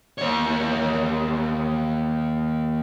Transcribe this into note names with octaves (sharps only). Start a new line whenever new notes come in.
D#2 C#5